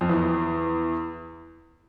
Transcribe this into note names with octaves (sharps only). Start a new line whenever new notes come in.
F2
E2